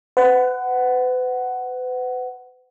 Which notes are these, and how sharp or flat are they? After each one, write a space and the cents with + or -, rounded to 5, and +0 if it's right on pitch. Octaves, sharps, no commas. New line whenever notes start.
B4 +40 F#5 +10